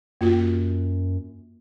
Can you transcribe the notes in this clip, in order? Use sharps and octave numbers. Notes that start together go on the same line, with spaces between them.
F#2 A#3 F4 F#4